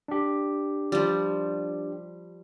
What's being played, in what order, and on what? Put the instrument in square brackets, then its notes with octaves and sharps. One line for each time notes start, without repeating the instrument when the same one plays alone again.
[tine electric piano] D4 G4
[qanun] F3 G3